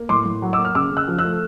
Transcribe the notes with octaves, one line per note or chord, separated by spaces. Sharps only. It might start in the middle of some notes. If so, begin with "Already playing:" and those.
Already playing: A#3
A2 C6 D6
A2
F#3
D6 E6
A#3
F6
C#3 D6 E6
C#3
E6 F#6
F3
E6 F#6
A3